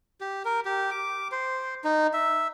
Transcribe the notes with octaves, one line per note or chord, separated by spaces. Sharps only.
G4
A#4
G4
D6
C5
D#4
E5